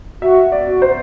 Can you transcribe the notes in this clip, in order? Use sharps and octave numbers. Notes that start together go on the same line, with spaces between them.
F#4 E5
D5
F#4
C5